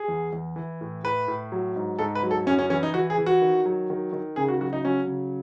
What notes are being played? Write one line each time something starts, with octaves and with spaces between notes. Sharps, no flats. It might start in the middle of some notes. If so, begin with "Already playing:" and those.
Already playing: G#4
E2
E2
E3
A2
A2 B4
A2
F#3
G#2
G#2 A4
B4
F#3
A4
F#2 C#4
C#4
E3 C#4
D#4
E3 F#4
G#4
E3
F#4
D#3
F#3
D#3
D#3
C#3 G#4
F#4
F#3 F#4
D#4
F#3 C#4
C#3